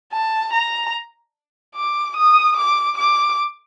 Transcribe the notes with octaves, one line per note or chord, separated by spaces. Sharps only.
A5
A#5
D6
D#6
D6
D6